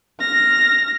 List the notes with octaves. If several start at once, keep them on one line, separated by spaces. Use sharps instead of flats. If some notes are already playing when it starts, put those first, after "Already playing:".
F6 A#6